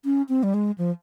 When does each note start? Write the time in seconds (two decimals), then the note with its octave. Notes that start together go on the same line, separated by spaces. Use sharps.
0.05 C#4
0.29 C4
0.43 G3
0.54 G#3
0.78 F3